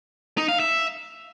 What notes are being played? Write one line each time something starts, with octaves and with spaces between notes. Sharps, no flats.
D#4
F5
E5